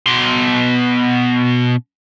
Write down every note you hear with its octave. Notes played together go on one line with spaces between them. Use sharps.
B2 C6